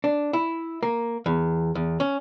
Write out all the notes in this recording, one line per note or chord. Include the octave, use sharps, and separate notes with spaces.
D4
E4
A#3
E2
E2
C#4